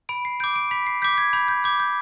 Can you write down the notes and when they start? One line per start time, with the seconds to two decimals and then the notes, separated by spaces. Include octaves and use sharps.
0.09 B5 D7
0.25 C7
0.40 D6 G6 D7
0.56 D7
0.71 B5 B6
0.87 C7
1.02 D6 G6 B6
1.18 G#6
1.33 B5 G6
1.48 G6
1.64 D6 G6
1.80 G6